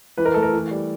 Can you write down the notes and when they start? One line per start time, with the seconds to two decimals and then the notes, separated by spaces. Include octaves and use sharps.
0.18 E3 B4
0.25 A#4
0.34 A3 A4
0.42 A#4
0.53 E3
0.71 G3